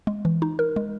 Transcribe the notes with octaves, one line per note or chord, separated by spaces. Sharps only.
G#3
E3
D#4
A#4
G#3